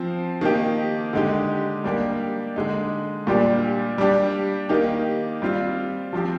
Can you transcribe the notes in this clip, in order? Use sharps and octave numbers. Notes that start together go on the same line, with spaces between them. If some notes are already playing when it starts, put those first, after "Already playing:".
Already playing: F3 C4
D#3 A#3 D#4 G4
D3 G#3 D#4 G4
G3 A#3 D4 G4
D3 G#3 D#4
A#2 G3 D4 G4
G3 D4 G4
D#3 A#3 D#4 G4
G3 C4 F4
F3 C4 G4